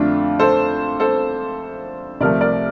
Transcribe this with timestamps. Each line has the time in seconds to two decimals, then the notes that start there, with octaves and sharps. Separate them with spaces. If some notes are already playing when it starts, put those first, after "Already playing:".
Already playing: F2 D3 A3 D4 F4
0.39 A4 C5
1.00 A4 C5
2.21 C2 C3 F3 A3 A#4 D5
2.41 A#4 D5